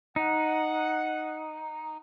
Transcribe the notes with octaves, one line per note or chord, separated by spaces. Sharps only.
D#4 F#5